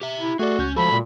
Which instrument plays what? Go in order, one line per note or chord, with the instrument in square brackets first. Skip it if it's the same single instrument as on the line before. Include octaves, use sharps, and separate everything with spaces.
[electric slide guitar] G4 E5
[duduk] E4
[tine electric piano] A3 D5 [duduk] F#4 [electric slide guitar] G#4 A4
[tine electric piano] C#2 G6 [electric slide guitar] C#4
[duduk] F3 [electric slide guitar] G#3 A3 F#4 [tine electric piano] A4 [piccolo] B5
[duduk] A#2